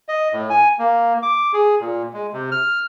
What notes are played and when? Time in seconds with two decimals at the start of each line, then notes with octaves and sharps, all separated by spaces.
0.09 D#5
0.33 A2
0.50 G#5
0.79 A#3
1.23 D6
1.53 G#4
1.80 A#2
2.13 G#3
2.33 C3
2.51 F6